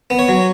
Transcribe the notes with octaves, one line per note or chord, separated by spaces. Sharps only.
B3
C#5
F#3